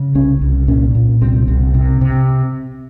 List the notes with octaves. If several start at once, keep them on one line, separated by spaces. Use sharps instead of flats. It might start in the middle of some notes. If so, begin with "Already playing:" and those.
Already playing: C#3
C2 C#4
C2
A#2 C#4
A#2
C2 C4
C2 C4
C3
C3